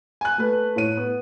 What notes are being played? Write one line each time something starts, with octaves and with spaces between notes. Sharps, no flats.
G#5 F#6
A3 B4
A2 C#5 D#7
B3